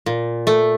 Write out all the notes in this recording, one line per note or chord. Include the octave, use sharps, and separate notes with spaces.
A#2
A3